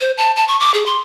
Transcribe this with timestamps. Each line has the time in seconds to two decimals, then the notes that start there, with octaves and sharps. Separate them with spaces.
0.01 C5
0.17 A5
0.36 A5
0.48 C#6
0.60 D6
0.74 G#4
0.86 C6